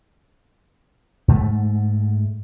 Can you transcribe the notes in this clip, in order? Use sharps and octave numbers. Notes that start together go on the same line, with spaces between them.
G#2 A3